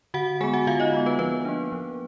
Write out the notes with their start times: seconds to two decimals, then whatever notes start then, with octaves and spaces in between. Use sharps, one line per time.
0.14 D3 F#4 F#5
0.40 G#3 B3 G#4 G#5
0.53 F#4 F#5
0.67 D3 F4 F5
0.80 D#4 D#5
0.93 G#3 B3
1.06 B3 B4
1.19 F3 B3 B4
1.45 A#3 D4
1.72 F3